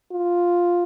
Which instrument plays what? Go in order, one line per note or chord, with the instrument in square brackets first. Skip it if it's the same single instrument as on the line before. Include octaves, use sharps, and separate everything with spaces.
[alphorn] F4